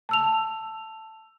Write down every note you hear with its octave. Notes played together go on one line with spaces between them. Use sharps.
A5 E6 F7